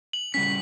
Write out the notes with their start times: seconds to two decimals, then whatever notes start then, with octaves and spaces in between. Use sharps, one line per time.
0.13 F#7
0.34 C#3 G3 C#4 B6